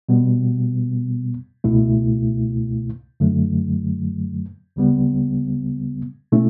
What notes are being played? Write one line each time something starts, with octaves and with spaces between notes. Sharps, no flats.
B2 G3 B3
C#2 B2 A3 E4
F#2 D3 F#3 A3
D2 C#3 G3 B3
B2 A3 C#4 E4